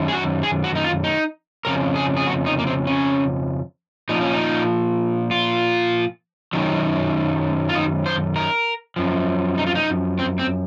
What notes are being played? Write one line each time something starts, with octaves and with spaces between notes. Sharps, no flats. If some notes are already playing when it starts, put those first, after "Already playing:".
Already playing: F#2 D#3 F#3
G#4
F#4
G#4
F#4
D#4
F4
D#4
F2 C#3 A#4
G#4
G#4
F#4
D#4
A#3
C4
C#4
A#2 F3 D#4
C#4
D#4
F4
F#2 D#3 F#3
F4
D#4
C5
A#4
F#2 F3
D#4
F4
D#4
C4
C4